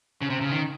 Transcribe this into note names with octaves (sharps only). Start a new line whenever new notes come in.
C#3
C3
C#3
D#3